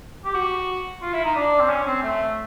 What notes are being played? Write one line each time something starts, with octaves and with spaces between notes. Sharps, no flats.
G4
F#4
F4
E4
D#4
D4
C4
C#4
C4
A3